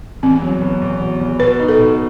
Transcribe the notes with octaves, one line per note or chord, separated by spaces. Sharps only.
E2 C4
F#3
B2
E2
B2
E2
B2 B4
D#4
A4
B2